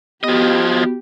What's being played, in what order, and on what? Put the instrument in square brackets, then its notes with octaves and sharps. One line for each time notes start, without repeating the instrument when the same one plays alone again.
[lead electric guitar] F3 D#5 [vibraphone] B3 F#4 [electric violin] G4